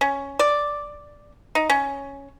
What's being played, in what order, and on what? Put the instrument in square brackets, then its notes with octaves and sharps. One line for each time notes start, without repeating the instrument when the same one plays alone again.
[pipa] C#4
D5
D#4
C#4